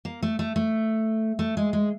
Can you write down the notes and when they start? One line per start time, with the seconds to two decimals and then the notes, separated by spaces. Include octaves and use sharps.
0.05 A#3
0.23 A3
0.39 A3
0.56 A3
1.39 A3
1.57 G#3
1.73 G#3